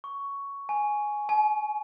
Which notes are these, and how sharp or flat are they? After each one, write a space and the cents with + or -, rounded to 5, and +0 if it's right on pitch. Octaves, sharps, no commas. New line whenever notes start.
C#6 +10
G#5 +5
G#5 +40